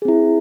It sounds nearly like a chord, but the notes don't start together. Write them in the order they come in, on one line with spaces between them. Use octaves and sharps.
G#4 C4 E4